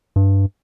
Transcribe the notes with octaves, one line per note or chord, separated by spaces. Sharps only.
G2